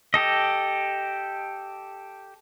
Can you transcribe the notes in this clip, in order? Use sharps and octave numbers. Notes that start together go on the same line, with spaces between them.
G4 A4 D#5